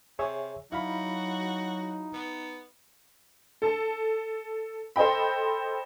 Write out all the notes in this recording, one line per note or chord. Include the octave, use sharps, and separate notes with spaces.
C3 G#4 C#5 E5
F#3 D#4 E4 F#4 F5 B5
B3
A4 A5
A4 C5 D#5 G5 B5